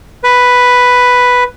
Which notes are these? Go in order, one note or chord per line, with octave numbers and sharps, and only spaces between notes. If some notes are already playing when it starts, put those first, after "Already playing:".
B4